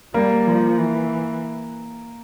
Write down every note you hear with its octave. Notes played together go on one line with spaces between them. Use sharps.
G3 A#3
F3
E3